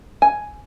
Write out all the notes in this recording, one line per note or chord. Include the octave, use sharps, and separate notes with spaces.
G#5